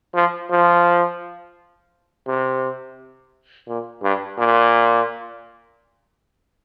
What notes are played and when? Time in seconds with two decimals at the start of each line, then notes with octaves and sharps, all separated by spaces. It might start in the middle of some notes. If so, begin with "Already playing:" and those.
0.14 F3
0.51 F3
2.27 C3
3.68 A#2
4.03 G2
4.38 A#2